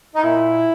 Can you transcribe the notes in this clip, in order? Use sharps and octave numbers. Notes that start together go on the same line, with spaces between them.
D#4
A#2 E4